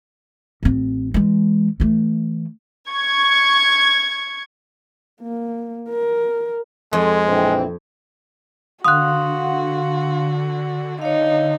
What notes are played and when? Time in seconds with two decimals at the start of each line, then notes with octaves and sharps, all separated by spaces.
0.63 A1 C4
1.14 E3 G#3
1.80 E3 A3
2.89 C#6 G#6
5.22 A#3
5.90 A#4
6.93 F2 G#3
7.27 A#1 E3 C4
8.84 D3 F#4 F5 F#5 C6 D#6 F#6
11.01 D#4 C#5 F5